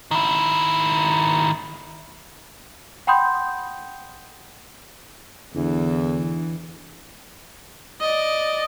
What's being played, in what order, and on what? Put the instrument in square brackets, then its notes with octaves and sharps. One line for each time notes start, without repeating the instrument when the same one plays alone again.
[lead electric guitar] D#3 E4
[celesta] F#5 G5 B5 C6 D#6 G6
[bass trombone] E2 [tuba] D3 [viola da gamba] E3
[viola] D5 D#5